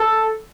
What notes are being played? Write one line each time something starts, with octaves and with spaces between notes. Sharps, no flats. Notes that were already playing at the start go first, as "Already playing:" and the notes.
Already playing: A4